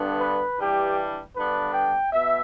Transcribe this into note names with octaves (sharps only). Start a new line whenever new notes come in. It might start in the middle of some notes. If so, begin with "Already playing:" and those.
Already playing: G2 D3 B3 D4
B4
G2 E3 G3 D4 G4
G2 D3 B3 D4 B4
G5
B2 E5